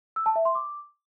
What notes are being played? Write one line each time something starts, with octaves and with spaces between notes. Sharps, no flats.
E6
A5
E5
C6
D6